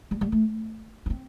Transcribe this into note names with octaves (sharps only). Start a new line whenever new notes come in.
G3
G3
A3
D4
C4